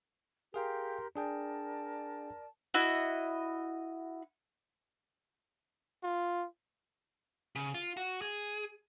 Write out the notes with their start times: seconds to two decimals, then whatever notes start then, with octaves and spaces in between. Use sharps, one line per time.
0.54 G4 G#4 A#4 F5 G5 C6
1.16 D4 G#4 A#4 D5 G5 A5
2.74 E4 F#4 D#5
6.03 F4
7.56 C#3
7.74 F4
7.97 F#4
8.22 G#4